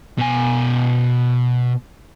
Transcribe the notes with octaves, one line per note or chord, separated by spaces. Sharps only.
B2 G#5